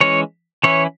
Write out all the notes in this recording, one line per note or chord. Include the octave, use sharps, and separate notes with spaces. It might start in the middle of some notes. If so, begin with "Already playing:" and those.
E3 G#3 C#4 C#5
E3 C#4 E4 C#5